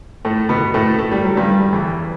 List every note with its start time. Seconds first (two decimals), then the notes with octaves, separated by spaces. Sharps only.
0.25 A2 A3
0.49 B2 B3
0.74 A2 A3
0.98 A3
1.11 G3
1.24 F#3
1.37 G2 G3
1.73 E2 E3